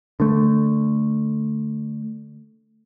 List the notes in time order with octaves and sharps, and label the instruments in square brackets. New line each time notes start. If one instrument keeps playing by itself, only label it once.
[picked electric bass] D3 A3